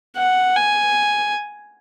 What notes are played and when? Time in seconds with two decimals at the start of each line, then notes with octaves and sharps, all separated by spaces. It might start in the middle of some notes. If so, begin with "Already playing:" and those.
0.17 F#5
0.57 G#5